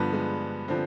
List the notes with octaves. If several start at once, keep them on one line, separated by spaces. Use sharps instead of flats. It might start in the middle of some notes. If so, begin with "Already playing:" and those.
Already playing: G2 D3 F3 B3
G#3
D3 F3 C4